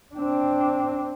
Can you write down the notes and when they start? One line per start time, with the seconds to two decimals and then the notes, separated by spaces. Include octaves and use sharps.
0.15 C4 D4